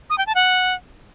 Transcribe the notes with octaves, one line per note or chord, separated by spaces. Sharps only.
D#6
G5
A5
F#5